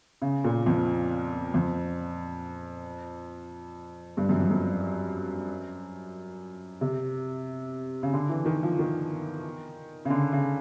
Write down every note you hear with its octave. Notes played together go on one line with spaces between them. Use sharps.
C#3
A#2
F2
F2
G2
F#2
F2
F#2
C3
C#3
D3
E3
D#3
F3
D#3
C#3
D3
C#3